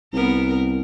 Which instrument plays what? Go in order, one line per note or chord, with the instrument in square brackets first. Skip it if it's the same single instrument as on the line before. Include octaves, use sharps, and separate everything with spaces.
[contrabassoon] C2 [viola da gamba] B3 A#4